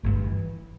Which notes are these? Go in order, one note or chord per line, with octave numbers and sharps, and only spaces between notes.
G1 G2 D3 A3
E3